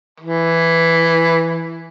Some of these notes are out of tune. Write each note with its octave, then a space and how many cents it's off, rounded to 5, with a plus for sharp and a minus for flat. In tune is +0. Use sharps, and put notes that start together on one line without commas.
E3 +5